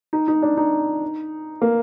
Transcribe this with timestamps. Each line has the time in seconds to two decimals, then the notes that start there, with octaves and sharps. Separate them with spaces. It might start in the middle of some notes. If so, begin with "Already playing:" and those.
0.13 D#4
0.28 D#4
0.42 D4
0.57 D#4
1.62 A#3